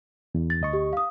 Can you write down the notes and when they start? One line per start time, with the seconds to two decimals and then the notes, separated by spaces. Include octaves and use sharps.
0.35 E2
0.50 A6
0.61 D2 D#5 C#6
0.73 G4
0.93 F5 D#6